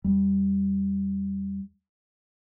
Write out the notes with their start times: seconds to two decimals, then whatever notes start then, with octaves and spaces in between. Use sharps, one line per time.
0.04 E2 G3